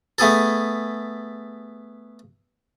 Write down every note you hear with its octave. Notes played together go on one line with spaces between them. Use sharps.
A3 B3 G#4 A4